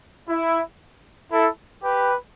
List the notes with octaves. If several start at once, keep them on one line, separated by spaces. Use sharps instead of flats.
E4
E4 A4
G4 B4